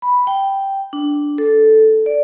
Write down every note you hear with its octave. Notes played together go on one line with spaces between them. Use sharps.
B5
G5
D4
A4
D5